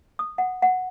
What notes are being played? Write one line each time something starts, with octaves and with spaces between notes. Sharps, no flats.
D#6
F#5
F#5